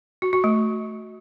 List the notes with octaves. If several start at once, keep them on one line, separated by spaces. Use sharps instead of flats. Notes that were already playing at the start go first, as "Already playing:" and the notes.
F#4
F#4
A3